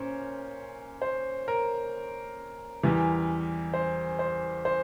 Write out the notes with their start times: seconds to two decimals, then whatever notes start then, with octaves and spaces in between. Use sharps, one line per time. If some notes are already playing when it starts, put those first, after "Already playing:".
Already playing: A#2 C#4 A#4 C5
1.02 C5
1.48 A#4
2.83 E2 E3 G3
3.74 C5
4.19 C5
4.65 C5